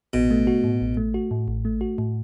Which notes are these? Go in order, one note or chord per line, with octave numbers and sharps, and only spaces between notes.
A1 B2
A3
F#4
A2
A1
A3
F#4
A2
A1
A3
F#4
A2